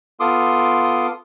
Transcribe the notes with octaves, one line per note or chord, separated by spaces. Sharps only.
B3 F4 A4 C6 D6 D#6